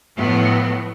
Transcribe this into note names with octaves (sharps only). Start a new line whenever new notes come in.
A2 F3 F#3 B3